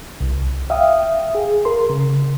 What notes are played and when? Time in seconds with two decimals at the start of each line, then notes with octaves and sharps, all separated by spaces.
0.21 C2
0.70 E5 F5 G5 D#6
1.35 G#4
1.65 A#4 C6
1.90 C#3